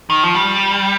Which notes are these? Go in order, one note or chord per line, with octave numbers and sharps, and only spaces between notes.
D#3
F3
G3